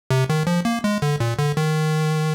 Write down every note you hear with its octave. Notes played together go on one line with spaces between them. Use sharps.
C3
D#3
F3
A#3
G#3
D3
A#2
D3
D#3